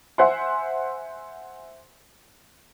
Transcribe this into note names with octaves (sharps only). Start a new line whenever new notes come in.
C5 E5 F#5 G#5 C6